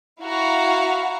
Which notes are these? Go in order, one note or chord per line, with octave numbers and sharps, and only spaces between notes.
E4 F#4 F5 A#5